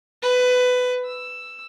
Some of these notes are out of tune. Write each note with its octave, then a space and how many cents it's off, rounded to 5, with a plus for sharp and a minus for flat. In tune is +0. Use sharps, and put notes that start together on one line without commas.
B4 +15
E6 +5